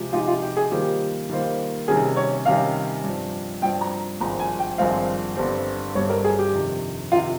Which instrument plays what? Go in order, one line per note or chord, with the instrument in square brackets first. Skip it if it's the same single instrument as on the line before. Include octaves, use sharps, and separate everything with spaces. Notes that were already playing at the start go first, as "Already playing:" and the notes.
Already playing: [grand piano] C3 F3 G#3 G4
[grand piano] C3 F3 G#3 D#4 G4 [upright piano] F4
[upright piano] F4
G4
G#4
[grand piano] D#3 G3 A#3 F4 C5 [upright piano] G4
[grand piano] D#3 G3 A#3 F4 C5
[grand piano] C3 D#3 G3 C#4 [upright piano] G#4
[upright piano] C#5
[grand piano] C3 D#3 G3 C#4 [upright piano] F5
[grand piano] G2 F3 C4
[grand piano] G2 F3 C4 [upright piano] G5
[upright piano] A#5
[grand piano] G#1 G2 F3 G#3 C4 [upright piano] A#5
[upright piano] G#5
G5
[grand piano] G#1 G2 F3 G#3 C4 [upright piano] F5
[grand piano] G1 G2 G3 C4
[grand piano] G1 G2 G3 C4 [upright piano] C#5
[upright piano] A#4
G#4
G4
[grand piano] F2 C3 D#3
[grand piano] C3 D#3 [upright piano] F4